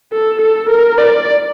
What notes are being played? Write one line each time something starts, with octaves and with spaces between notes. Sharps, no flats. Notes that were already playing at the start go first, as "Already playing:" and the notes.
A4
A4
A#4
D5